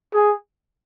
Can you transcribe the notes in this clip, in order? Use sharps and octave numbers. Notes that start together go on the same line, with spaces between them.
G#4